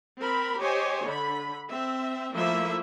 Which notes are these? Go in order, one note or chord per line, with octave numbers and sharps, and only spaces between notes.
C4 A#4 B5
G4 C5 C#5 D#5 G#5
D3 B5
C4 E5
F3 A3 A#3 E4 E5